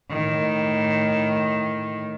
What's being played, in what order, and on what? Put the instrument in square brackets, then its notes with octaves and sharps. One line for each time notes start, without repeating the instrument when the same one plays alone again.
[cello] A2 D#3